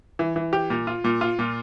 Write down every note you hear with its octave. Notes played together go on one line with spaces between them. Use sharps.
E3
E3
G4
A#2
F4
A#2
F4
A#2